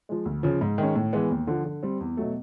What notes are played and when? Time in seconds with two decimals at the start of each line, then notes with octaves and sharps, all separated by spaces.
0.09 F3 G#3
0.26 D2
0.43 C#3 F3
0.61 G#2
0.78 D#3 G#3 C#4
0.96 A2
1.13 E3 G#3 B3
1.30 D#2
1.47 D3 F3
1.65 D3
1.83 G3 C4
2.00 E2
2.17 B2 F#3 A3